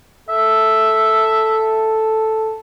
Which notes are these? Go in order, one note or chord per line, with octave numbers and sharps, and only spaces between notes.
A4 E5